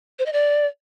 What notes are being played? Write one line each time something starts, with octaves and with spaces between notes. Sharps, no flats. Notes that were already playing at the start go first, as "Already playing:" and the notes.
C5
D#5
D5